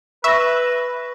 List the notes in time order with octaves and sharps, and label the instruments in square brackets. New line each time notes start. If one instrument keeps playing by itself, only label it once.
[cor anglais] B4 [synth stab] E5 [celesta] C#6 A#6